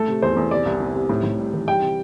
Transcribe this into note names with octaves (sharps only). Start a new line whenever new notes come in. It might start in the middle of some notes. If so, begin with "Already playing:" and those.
Already playing: A3 A4
C3
E2 C5
E2
C3 D5
C2
C3
C3
A2
A2
G3
E3
G3 G5
C3